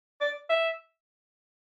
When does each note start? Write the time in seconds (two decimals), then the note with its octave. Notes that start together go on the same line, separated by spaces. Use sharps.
0.21 D5
0.50 E5